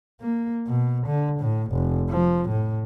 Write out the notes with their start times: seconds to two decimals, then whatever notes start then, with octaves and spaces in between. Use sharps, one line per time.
0.21 A#3
0.67 B2
1.06 D3
1.40 A2
1.71 F1
2.09 F3
2.49 A2